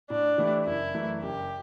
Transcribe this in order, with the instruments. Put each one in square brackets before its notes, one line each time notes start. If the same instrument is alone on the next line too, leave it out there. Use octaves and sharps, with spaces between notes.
[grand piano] A2 [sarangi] D4
[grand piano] E3 A3 E4 G4
[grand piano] F#1 [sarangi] E4
[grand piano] F#2 E3 A3
[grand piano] F#1 [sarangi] G4